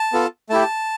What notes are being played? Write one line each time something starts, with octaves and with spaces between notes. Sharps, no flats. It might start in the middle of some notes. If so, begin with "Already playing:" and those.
Already playing: A5
B3 F4 A4
A3 E4 G4 A5